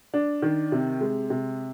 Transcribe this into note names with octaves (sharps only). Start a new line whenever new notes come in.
D4
D#3
C3
G#3
C3